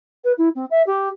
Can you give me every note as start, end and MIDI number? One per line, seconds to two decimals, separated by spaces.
0.24 0.32 71
0.38 0.49 64
0.55 0.65 60
0.70 0.82 76
0.87 1.09 67